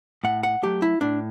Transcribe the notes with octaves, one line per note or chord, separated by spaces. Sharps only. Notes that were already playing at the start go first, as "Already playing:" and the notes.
A2 F#5
F#5
F#3 A3 G4
E4
A2 D4